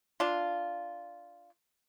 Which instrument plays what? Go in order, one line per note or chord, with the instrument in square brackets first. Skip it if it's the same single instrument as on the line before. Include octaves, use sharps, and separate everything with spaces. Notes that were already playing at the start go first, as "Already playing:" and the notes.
[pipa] D4 F4